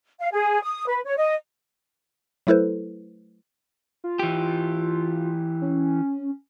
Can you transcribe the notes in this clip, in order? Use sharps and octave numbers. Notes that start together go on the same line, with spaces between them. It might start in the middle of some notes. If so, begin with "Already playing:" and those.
F5
G#4
D#6
B4
C#5
D#5
F#3 A3 E4 A4 B4 C5
F4
E3 G4
C#4